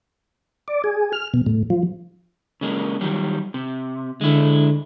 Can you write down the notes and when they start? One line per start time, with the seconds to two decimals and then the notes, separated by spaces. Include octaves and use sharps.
0.68 D5
0.84 G#4
1.12 F6
1.34 B2
1.46 A2
1.70 F3
2.61 C#3 G#3 A#3
3.01 D#3 F#3 G3
3.54 C3
4.21 D3 G#3 E4